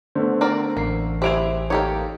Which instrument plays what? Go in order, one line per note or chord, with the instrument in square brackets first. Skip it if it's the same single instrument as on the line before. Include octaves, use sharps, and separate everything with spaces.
[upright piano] D3 A3 [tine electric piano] B3 C5
[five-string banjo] C4 A#4 D5
[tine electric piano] A1 C7 [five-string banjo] A#3
[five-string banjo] C4 E4 G#4 [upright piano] G4 D7 F7
[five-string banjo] A#3 G4 C#5 [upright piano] D#4 A4